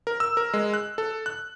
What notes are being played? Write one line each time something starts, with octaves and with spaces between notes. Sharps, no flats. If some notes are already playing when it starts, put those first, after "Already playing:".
A#4
E6
A#4
G#3
F#6
A4
F#6